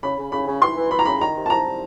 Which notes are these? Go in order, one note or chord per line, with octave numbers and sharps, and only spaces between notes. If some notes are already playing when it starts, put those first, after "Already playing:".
C#3 B5
C#3
C#3 B5
C#3
E3 C6
E3
E3 B5
A#5
C#3 B5
D#3 A#5
C3
A5
C3 A#5